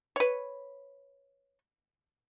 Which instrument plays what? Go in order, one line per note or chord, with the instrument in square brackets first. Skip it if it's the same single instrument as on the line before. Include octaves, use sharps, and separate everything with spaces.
[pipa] B4 C#5